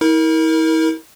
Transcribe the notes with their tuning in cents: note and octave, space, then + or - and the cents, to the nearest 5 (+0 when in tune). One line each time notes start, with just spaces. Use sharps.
E4 -40 A#4 +0